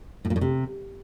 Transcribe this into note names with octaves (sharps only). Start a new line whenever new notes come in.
A2
A#2
A2
C3